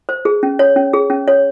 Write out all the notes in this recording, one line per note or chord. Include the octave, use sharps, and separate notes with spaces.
C5
G#4
C#4
C#5
C#4
G#4
C#4
C#5